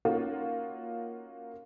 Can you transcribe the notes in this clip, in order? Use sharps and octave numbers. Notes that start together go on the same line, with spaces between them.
A#3 C#4 D#4 F4 F#4